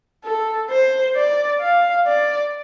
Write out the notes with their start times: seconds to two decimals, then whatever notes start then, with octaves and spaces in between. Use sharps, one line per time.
0.24 A4
0.70 C5
1.15 D5
1.61 F5
2.06 D5